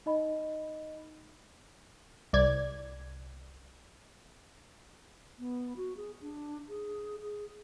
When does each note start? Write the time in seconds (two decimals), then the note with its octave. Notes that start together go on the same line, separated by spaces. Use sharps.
0.06 D#4 D#5 B5
2.33 C2 D5 G#6
5.39 B3
5.77 F#4
5.97 G#4
6.21 D4
6.69 G#4
7.21 G#4